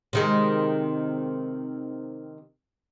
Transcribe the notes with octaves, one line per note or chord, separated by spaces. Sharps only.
C3 D#3 G#3